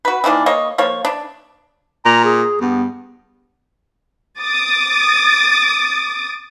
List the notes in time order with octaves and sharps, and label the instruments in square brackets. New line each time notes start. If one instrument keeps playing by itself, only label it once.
[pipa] F#4 B4
D#3 E3 A#3 D4
A#3 C#5 D#5
F3 A#3 C#5
D4
[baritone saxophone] A#2 [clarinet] A#5
[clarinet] G#4
[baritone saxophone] G2 [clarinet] B3
[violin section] D6 D#6 A6